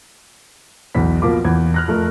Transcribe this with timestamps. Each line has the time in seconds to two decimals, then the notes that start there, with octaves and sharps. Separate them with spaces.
0.95 B1 E2 B2 B6
1.22 B2 F3 A#3 F4 D6
1.45 E2 G#6
1.74 F6 F#6 A#6
1.88 F2 A3 A#4